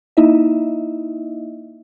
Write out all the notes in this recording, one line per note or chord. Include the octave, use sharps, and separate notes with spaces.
A#3 D#4 E4 D#5 E5